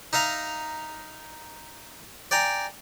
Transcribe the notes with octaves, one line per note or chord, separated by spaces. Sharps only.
D#4 E5 F5 A#5
D5 G5 G#5 A#5